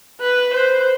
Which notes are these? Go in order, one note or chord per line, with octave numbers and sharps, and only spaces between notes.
B4
C5